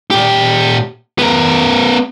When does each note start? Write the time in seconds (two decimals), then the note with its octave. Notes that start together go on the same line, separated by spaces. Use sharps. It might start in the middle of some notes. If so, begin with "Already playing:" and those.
0.11 A#2 G4
1.19 B3 A#4